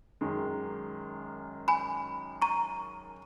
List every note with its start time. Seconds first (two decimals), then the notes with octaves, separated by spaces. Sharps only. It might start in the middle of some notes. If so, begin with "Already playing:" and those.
0.21 F#2 D#3 G#3
1.68 G#5 B5
2.42 A#5 C#6